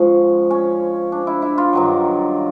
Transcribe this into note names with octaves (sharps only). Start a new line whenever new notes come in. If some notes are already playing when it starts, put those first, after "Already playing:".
Already playing: G#2 F3 C#4
C#4
D4
E4
E4
F4
G2 D#3 F#3